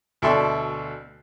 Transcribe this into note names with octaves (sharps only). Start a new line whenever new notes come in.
D2 B2 A4 D5 E5 C6